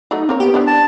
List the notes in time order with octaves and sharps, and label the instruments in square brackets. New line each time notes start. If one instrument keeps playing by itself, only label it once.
[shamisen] F#3 A3 F#4 [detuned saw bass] D#4
[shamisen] A#3 A#4 C#5 [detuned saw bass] C4
[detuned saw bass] B3 [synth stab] G4
[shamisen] B3 C4 E4 [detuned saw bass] D4
[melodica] A5